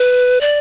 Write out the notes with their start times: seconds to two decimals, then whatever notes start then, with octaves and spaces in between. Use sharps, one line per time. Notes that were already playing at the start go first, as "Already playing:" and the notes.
Already playing: B4
0.41 D5